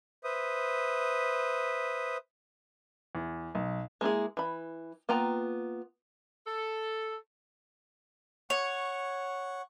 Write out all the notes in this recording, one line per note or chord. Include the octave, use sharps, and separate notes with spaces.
B4 C5 E5 D#6
E2
B1
G#3 A#3 E4 G#4
E3 B5
A#3 B3 F4 G5 A#5
A4
C#5 F#5 C#6